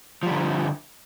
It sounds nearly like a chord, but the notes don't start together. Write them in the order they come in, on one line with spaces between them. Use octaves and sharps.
F3 G3 D3